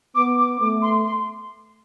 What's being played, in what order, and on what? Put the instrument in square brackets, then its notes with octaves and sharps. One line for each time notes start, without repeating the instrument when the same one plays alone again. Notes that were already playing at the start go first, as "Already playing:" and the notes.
[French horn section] B3 [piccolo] D6
[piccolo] D6
[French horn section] A3 [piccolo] D6
[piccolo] C6
C6